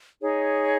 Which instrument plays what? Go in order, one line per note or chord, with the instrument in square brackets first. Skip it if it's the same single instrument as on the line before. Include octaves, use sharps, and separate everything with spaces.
[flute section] D#4 G#4 C#5